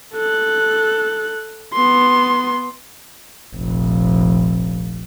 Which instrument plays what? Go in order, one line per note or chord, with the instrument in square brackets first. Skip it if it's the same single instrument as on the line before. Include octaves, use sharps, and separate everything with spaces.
[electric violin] A4 F#6
B3 C6
[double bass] F1 A#1